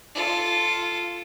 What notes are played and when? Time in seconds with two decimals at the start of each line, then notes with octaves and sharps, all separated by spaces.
0.15 F4 A4